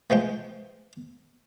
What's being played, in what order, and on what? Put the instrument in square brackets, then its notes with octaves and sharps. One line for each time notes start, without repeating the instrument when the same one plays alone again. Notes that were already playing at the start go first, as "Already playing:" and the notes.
[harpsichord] E3 F3 G#3 G5